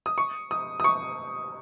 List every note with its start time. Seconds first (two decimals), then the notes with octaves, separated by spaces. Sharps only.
0.06 D#6
0.18 C#6
0.51 D#6
0.80 D#6
0.84 C#6